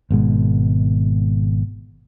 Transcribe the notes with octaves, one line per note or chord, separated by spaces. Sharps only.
G#1 B2 G#3